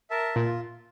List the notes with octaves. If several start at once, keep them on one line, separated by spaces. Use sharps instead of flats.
A#4 E5 A5
A#2 F4